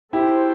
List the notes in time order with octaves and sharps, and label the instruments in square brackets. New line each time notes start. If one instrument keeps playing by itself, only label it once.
[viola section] C4 F#4 A4 C5 [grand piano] E4 G4